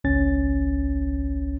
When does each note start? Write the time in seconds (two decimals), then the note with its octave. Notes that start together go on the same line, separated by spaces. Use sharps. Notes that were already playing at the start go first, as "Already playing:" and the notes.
0.04 G#1 C#2 C#4 A6